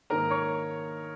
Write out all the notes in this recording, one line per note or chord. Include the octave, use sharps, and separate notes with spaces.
G#2 D#3 A#3 A#4 A#5
C#5 C#6